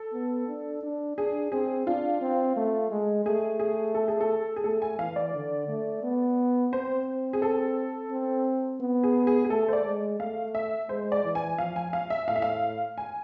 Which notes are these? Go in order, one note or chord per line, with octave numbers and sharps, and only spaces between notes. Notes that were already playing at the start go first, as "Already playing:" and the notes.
Already playing: A4
B3
D4
D4
D4 G#4
C4 G#4
D4 F4
C4
A3
G#3
A3 G#4
G#4
A4
G#4
A4
G#4
A3 A4
G#5
E3 F5
D5
D3
A3
B3
C4 C5
G#4
A4
C4
B3
G#4
G#4
G#4
A3 A4
C5
D5
G#3
A3 F5
E5
G#3 C5
D5
E3
G#5
F3 F5
G#5
F5
E5
A2 F5
E5
F5
G#5